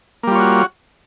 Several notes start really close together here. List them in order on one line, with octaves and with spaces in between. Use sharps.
A#3 G3 F4 C#5 F#4